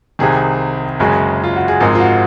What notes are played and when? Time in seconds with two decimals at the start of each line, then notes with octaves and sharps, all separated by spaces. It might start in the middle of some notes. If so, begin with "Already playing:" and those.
0.19 C2 C3 D#3 G#4
1.00 F#1 F#2 C#3 G#3 G#4
1.44 F4
1.56 F#4
1.68 G#4
1.80 G#1 G#2 F3 G#3 A#4
1.95 F4
2.00 F#4